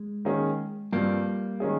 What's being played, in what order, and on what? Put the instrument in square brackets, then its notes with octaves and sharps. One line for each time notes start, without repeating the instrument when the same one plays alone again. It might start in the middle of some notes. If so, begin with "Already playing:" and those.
Already playing: [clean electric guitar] G#3
[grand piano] D#3 A#3 C#4 G#4
[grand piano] G2 F3 C4 [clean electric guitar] G3 A#3
[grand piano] D#3 G#3 C#4 G#4